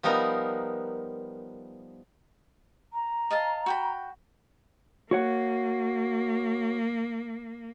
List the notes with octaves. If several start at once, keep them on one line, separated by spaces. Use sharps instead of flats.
F3 G3 B3 D#4 A#4
A#5
D#5 F5 A5
F#4 G5 B5
A#3 F#4 C#5 F#5